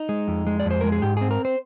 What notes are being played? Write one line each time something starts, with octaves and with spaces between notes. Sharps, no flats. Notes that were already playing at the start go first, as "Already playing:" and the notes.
Already playing: D#4
G#3
F2
G#3
D5
F2
C5
G#3 A#4
G#4
G#2 G4
C4 G#4
A#4
C5